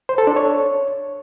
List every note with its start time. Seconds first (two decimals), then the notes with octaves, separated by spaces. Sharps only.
0.09 C5
0.18 A4
0.27 D4
0.36 C#5